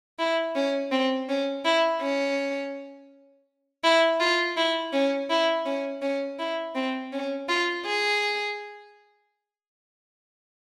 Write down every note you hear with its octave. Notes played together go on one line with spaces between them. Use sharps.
E4
C#4
C4
C#4
E4
C#4
E4
F4
E4
C#4
E4
C#4
C#4
E4
C4
C#4
F4
G#4